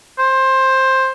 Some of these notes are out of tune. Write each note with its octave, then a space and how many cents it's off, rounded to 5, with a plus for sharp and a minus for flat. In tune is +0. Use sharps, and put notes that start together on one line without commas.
C5 +15